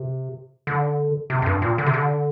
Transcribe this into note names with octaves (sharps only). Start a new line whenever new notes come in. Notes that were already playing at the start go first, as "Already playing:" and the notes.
Already playing: C3
D3
C3
F2
G2
A#2
D3
C3
D3